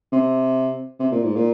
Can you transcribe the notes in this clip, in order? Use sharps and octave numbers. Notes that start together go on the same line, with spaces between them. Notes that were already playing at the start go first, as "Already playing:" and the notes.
C3
C3
A#2
G#2
A#2